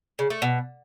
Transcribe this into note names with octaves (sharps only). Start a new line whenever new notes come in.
C#3
A3
B2